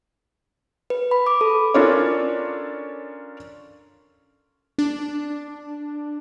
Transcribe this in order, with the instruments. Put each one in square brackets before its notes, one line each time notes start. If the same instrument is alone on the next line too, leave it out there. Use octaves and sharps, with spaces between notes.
[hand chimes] B4
B5
D6
A4
[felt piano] C#4 D4 F4 A4 A#4 C#5
[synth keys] D4